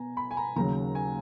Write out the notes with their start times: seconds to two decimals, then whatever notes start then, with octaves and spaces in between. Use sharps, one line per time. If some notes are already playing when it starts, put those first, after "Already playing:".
Already playing: B2 G#5 A#5
0.17 B5
0.31 G#5
0.37 A#5
0.56 D#2 C#3 F#3 A#5
0.95 G#5